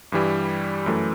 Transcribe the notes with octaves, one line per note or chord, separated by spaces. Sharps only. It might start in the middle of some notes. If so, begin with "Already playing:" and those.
G2 E3 G3
F#2 E3 A3